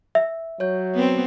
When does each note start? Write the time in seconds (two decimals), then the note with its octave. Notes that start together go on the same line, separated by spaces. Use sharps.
0.15 E5
0.60 F#3 C#5 G6
0.94 B3 C4